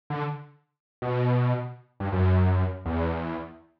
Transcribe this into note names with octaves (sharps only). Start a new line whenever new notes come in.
D3
B2
G2
F#2
E2